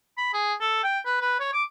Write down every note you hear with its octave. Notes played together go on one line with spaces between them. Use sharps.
B5
G#4
A4
G5
B4
B4
C#5
D6